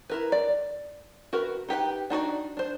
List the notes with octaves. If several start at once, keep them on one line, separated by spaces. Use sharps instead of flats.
E4 A#4 B4
D5
F#4 A#4 B4
D#4 G4 B4 G5
D4 D#4 F#4 D5
D4 C5